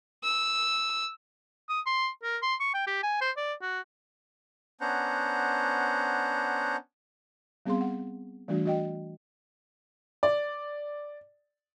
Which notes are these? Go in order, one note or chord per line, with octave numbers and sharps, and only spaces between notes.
E6
D#6
C6
A#4
C6
C#6
G5
G4
G#5
C5
D5
F#4
B3 C#4 D4 C5 F#5 A#5
G3 B3 C4 G#4 F5 C6
F#5
E3 G3 A3 D4 F#4
F#4 D#5 G5
D5